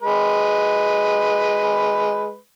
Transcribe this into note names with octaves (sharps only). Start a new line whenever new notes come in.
G#3 B4